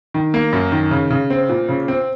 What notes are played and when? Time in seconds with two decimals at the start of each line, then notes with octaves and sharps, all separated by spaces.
0.14 D#3
0.34 A#3
0.53 F#2
0.72 D#3
0.91 C#3
1.11 C#3
1.30 C4
1.49 A#2
1.69 C#3
1.88 C4